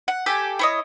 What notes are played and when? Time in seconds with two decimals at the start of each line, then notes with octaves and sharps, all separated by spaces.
0.08 F#5
0.26 G4 A4 G5 G#5
0.59 E4 C#5 D#5